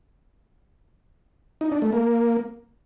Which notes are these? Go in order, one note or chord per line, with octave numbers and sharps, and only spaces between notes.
D#4
D4
A3
A#3